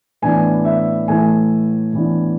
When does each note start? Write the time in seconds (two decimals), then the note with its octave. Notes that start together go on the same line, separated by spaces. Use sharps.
0.22 A2 E3 B3 D4 G#5
0.65 E5
1.08 A2 E3 A3 G#5
1.93 A2 E3 B3 D4